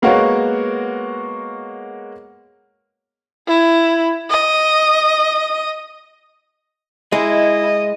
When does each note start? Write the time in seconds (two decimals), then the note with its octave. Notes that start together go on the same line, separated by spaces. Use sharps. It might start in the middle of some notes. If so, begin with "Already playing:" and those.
0.02 G#3 A#3 B3 F#4 A#4 C#5
3.47 E4
4.30 D#5
7.12 G#3 E4 D#5